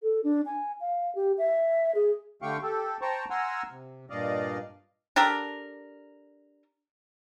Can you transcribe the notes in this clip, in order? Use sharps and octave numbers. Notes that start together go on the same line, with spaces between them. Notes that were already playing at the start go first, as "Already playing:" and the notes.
A4
D4
G#5
F5
G4
E5
G#4
D3 A3 G4 F5 G5 C#6
G4 A4
C5 G5 A5 A#5 C#6
F#5 G#5 A#5 C6 E6 F6
C3
G2 A#2 D5 D#5 F5
D4 G4 A4 A#4